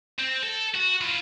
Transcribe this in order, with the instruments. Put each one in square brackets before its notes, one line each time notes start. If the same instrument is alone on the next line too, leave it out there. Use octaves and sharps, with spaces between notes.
[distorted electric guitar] C4
A4
F#4
E4 F4